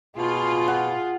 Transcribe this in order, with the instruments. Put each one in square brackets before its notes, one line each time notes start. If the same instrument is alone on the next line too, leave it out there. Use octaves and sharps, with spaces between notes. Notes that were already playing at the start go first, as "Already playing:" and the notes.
[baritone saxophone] B2 [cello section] F4 [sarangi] G#4
[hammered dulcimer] F#5